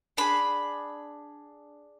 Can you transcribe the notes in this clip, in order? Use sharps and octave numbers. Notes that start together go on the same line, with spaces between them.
D4 G#4 B5